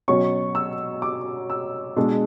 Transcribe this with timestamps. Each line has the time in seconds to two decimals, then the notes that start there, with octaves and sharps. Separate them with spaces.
0.08 B2 F#3 C#4 C#6
0.55 E6
1.02 D6
1.50 E6
1.96 B2 G#3 D4